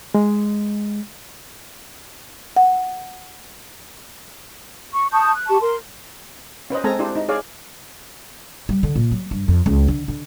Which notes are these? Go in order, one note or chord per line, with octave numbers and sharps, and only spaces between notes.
G#3
F#5
C#6
A5 C#6 D#6 G6
F#6
G4 A5 C#6
A#4 C6
C#4 B4 C5 D#5
G#3 C4 A4 G#5 A#5
D4 E4 G4 C5
D#4
G#4 C#5 D5 F5
G3
D3
A#2
F#3
G2
F2
C#2
D3
D3